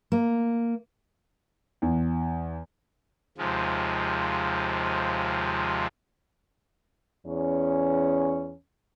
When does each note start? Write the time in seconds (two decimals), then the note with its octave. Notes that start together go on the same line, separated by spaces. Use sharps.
0.12 A#3
1.82 E2
3.38 D#2 C3 F3 G#3
7.26 E2 C#4